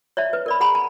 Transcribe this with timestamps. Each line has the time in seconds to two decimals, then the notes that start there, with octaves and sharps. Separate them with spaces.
0.17 C#5 D5 E5 A5
0.33 B4
0.46 A#4 D5 B5
0.60 G#4 F#5 G#5 A#5 B5
0.75 A5